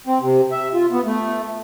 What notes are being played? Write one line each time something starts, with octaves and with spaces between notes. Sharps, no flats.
C4
C3
E5
F4
B3
A3